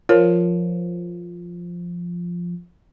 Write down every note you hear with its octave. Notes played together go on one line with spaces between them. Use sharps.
F3 A#4 C#5